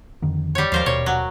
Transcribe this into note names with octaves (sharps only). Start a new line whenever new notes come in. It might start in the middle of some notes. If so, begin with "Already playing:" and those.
F2 D3 D#3
G3 C#5
D#2 F3 A#4 C5 F5
D#1 B2 C#5
F#3